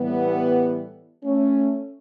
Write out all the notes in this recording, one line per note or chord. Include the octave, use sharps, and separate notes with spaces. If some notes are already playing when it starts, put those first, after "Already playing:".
Already playing: A2 E3 G3 B3
A3 C#4